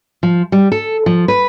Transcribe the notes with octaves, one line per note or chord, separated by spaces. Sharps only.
F3
G3
A4
F3
B4